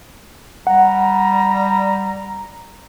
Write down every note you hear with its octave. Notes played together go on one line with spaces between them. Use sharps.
G3 F#5 A#5